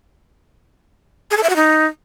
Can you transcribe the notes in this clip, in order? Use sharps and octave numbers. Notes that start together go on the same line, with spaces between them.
G#4
A4
E5
F#4
D#4